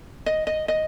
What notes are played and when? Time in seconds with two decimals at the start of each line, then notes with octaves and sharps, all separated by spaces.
0.26 D#5
0.47 D#5
0.68 D#5